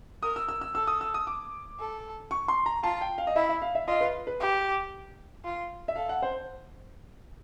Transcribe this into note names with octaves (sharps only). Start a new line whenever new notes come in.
A#4 D#6
E6
E6
E6
A4 E6
D#6
E6
D#6
D6
A4
C#6
C6
A#5
F4 A5
G5
F5
D#5
E4 E5
E5
F5
E5
F4 D#5
B4
B4
G4
F4
E5
A4 F5
F#5
C5